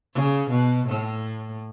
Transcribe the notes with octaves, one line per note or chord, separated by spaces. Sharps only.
C#3
B2
A2